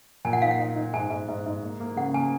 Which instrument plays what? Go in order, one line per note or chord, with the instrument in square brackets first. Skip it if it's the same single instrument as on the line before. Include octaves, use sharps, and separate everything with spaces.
[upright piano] A#2 [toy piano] G#5
[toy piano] F#5
[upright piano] D#4 [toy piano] F5
[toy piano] F#5
[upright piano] D#4
D#4
[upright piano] G#2 [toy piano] G#5
[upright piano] G#2
G#2
G#2
A#3
A#3
[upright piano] C#3 [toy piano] F#5
[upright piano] A#3 [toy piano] G#5